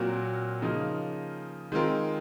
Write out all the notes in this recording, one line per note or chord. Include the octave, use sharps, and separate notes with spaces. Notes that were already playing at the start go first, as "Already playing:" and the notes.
Already playing: A#2 F#3 C4 F#4 A#4
C#3 F3 A#3 D#4
D#3 G#3 C4 F4 A#4